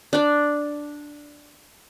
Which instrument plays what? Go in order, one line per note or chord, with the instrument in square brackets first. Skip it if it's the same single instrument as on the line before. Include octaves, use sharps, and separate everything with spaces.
[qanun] D4 D5